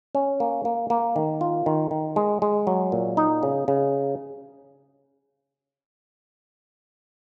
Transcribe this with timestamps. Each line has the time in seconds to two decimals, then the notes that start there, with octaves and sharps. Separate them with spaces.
0.15 C#4
0.40 A#3
0.65 A#3
0.90 A#3
1.16 D#3
1.41 F4
1.66 D#3
1.91 D#3
2.16 G#3
2.42 G#3
2.67 F#3
2.92 A#2
3.17 D#4
3.43 C#3
3.68 C#3